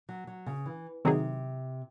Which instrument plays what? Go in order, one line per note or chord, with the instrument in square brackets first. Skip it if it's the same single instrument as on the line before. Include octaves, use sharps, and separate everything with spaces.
[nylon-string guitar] F#3
F#3
C#3
E3
[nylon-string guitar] C3 [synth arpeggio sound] D#3 F#3 C4 D#4 G#4